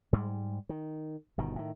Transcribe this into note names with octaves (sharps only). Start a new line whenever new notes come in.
G#2 G3 G#3
D#3
G1 B2 D#3
A2 D#3